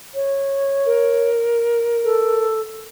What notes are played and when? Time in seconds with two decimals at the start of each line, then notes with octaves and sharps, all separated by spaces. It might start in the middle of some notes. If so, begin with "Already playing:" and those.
0.15 C#5
0.86 A#4
2.04 A4